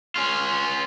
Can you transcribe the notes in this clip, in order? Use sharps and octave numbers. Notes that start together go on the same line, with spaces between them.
C#4 F4